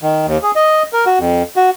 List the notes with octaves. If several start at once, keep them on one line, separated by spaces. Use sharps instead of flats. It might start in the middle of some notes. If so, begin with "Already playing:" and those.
D#3
D#2
G#4
D#5
A#4
F#4
F2
F#4